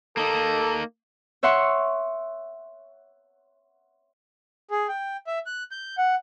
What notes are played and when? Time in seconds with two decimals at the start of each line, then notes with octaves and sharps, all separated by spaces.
0.17 A#3 D#4 A4
1.43 C#5 E5 F#5 C6 C#6
4.70 G#4
4.89 G5
5.27 E5
5.46 F#6
5.71 G6
5.98 F#5